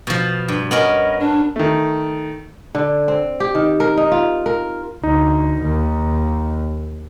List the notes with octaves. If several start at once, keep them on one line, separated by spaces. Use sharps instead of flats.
B2 F3
G2
B3 C#4 A#4 D#5
D4
D#3 A3
D3
C4
G4
D#3
A#4
D#4
F4
A#4
D2 D#4
D#2